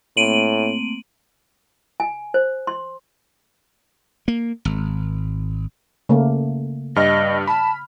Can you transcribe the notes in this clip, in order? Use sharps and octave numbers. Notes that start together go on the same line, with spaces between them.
A2 A3 A#3 C4 D7 D#7 F#7
G#5
C5
C6
A#3
G#1
C#3 A3 A#3
G2 G3 D#5 F6
A5 B5